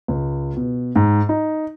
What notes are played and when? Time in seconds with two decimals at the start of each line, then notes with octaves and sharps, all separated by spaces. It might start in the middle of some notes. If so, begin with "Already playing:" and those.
0.08 C#2
0.57 B2
0.96 G#2
1.29 D#4